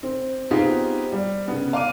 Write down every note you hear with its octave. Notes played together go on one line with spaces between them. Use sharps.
C4
B3 C4 D#4 F4 G4 G#4
G3
C#3 B3
F5 D6 D#7